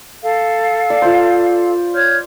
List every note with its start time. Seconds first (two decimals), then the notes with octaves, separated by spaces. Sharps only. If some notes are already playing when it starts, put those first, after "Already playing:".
0.22 A4 F5
0.90 D5
1.02 F4 C5
1.93 C#5 F6 G6